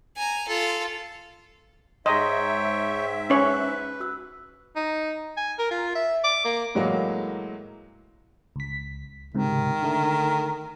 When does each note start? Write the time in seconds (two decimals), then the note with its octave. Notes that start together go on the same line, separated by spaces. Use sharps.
0.17 G#5 A#5
0.48 F4 A4
2.06 G#2 G#4 C#5 D#5 E5 G5 A#5 C6
3.30 C#4 B4 C#5
4.00 F#4 E6 F#6
4.76 D#4
5.37 G#5
5.59 A#4
5.71 F4
5.95 E5
6.24 D6
6.44 A#3
6.75 A2 E3 F#3 G#3 A#3 F#4
8.56 C#2 B6
9.35 C#2 G#2 C3 D#3
9.82 D3 A3